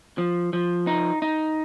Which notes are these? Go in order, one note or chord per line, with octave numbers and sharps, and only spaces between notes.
F3
F3
D#4
D#4